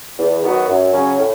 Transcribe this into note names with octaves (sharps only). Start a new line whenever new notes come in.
E2
D#3 F#3 B3 F#4
F#2
C#3 F#3 C#4
A2